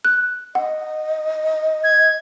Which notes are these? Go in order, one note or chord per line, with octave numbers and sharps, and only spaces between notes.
F#6
D#5 F#5
G#6